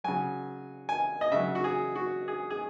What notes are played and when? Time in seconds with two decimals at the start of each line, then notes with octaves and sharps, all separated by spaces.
0.04 C#3 F#3 G#5
0.89 G#5
1.21 D#5
1.32 C#3 F#3 E5
1.55 F#4
1.64 G#4
1.95 F#4
2.28 G#4
2.50 G#4